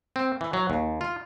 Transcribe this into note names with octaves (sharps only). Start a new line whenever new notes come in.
C4
E3
F#3
D#2
F4